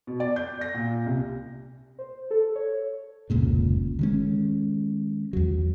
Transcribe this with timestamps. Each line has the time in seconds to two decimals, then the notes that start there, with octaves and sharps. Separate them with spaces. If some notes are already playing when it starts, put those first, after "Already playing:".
0.07 B2
0.20 D5
0.36 G6
0.61 A#6
0.74 A#2
1.06 C2
1.99 C5
2.31 A4
2.56 C#5
3.30 F1 C#2 A#2 C#3
3.99 D#3 G#3 C#4
5.33 E2 F#3